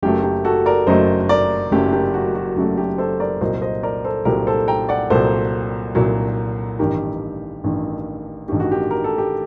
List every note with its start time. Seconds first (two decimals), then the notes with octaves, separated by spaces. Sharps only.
0.02 F#1 F#2 F#3 A3 G4
0.24 G4
0.45 F#4 A4
0.66 A#4 D5
0.87 F#1 F#2 F#3 A3 C5 D#5
1.29 A#4 D5
1.72 F#1 F#2 F#3 A3 G4
1.93 G4
2.14 F#4
2.35 F#4
2.57 F#1 F#2 F#3 A3 F#4
2.78 G4
2.98 A4 C5
3.20 A#4 D5
3.41 C2 A#2 F#3 C5 D#5
3.62 C5 D#5
3.83 A#4 D5
4.04 A4 C5
4.25 C2 A#2 F#3 G4 A#4
4.47 A4 C5
4.68 G5 A#5
4.89 D5 F#5
5.10 C2 A#2 F#3 A4 C5
5.95 C2 A#2 F#3
6.79 A1 G2 D#3 G4 A#4
7.64 A1 G2 D#3
8.48 A1 G2 D#3 G4
8.60 F#4
8.72 G4
8.91 A#4
9.04 A4
9.18 G4